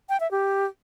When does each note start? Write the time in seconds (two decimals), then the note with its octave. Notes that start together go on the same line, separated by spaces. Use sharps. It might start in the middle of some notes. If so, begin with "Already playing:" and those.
0.09 G5
0.20 E5
0.31 G4